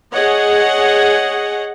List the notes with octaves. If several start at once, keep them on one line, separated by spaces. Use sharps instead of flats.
G#4 C#5 D#5 F#5